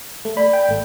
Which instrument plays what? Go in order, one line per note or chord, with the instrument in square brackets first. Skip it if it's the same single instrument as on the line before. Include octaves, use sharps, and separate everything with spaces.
[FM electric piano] A3
[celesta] D5 [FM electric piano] B5
[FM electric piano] G5
G#1 A3